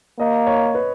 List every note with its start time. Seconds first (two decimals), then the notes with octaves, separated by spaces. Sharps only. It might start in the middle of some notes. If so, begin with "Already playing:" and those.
0.19 A#3 D#5
0.47 C#5
0.75 B4